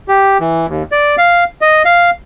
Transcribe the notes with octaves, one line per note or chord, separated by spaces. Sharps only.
G4
E3
D#2
D5
F5
D#5
F5